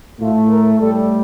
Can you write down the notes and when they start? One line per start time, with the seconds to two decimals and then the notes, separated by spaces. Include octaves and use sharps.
0.20 A2 A3 F4
0.50 A#4
0.79 A2 G3 A4